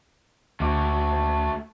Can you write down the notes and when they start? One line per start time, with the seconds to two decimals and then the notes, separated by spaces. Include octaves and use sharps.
0.60 D2 A3 F#4 D6